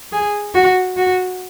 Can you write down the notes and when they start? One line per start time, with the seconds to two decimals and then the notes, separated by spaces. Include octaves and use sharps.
0.12 G#4
0.54 F#4
0.97 F#4